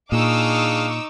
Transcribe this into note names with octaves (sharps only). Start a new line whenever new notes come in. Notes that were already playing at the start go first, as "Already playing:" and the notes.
A#2 D4 D#4 G#4 F5 C#6 D6 E6